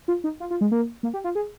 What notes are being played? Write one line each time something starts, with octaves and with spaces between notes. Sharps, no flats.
F4
D#4
F4
F4
G#3
A#3
A#3
G4
F4
G#4